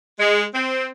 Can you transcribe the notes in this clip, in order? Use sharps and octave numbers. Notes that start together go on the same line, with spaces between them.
G#3
C4